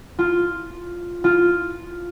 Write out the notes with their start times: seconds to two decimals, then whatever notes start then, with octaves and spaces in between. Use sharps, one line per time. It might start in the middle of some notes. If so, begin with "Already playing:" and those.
0.19 F4
1.24 F4